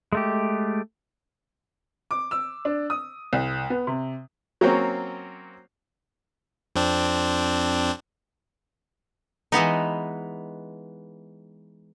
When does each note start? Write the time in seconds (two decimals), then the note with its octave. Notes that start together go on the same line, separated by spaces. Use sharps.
0.13 G#3 A3 G4
2.11 D6
2.31 E6
2.65 D4
2.90 D#6
3.33 C2
3.70 B3
3.87 C3
4.61 F#3 A#3 C4 C#4
6.75 F2 C4 D4
9.52 E3 G#3 B3 D#4